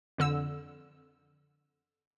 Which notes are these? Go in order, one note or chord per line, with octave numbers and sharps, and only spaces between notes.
F2 D3 E6